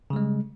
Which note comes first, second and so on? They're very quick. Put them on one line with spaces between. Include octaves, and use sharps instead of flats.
C#3 G3 G#3